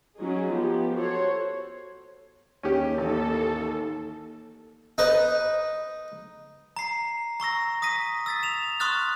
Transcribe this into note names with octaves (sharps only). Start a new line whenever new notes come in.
F#3 C#4 D#4 G#4
F3 B3 G4
F#4 A4 C5 C#5
D#2 C#4 G4
A1 D#2 A4
D#4 B4
A#5 C7
A#5 C#6 E6 A#6
D#6 A#6 B6 D#7
E6 A6 B6
E7 F7
C6 C#6 D#6 F6 F#6 A6